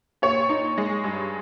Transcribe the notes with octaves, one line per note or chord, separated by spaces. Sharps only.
A#2 C#5
D#4
G#3
G2